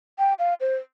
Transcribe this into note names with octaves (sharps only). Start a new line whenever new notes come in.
G5
F5
C5